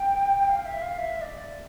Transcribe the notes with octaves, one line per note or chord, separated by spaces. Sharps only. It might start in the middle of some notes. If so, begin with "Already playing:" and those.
Already playing: G5
F5
E5
F5
E5
D5